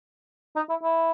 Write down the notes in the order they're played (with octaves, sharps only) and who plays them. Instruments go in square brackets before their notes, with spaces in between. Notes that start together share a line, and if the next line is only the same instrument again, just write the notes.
[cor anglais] D#4
E4
E4